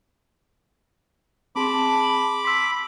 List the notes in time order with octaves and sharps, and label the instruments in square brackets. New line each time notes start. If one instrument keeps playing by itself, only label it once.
[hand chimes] C4 G#4 C6 [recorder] A5 [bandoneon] B5 D6
[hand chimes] C6 E6 [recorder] B6